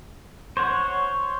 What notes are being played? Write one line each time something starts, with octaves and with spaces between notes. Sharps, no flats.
C5 C#5 F#5